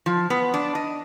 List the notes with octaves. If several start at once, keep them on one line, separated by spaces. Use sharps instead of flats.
F3
B3
D4
D#5